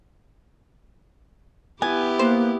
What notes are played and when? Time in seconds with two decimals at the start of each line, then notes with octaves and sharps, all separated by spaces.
1.82 B3 E4 G4 G#5
2.19 A#3 C5